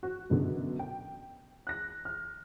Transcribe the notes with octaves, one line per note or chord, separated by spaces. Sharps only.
F#4
F#2 B2 D3
G5
F#6 A#6
F6